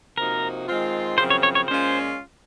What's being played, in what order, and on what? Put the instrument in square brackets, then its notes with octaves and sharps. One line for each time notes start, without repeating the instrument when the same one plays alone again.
[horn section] C3 F3 A#3 D#4 F#4 [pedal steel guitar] A#4
[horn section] D#3 G#3 C4 F4
[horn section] F#2 C#3 F3 C4 [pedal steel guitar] C5
[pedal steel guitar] C#5
C#5
C#5
[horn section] A#2 G#3 C#4 F4 [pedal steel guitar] C5